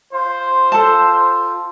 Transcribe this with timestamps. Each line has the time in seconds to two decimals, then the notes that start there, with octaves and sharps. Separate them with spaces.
0.13 F4 C5
0.72 A4 A5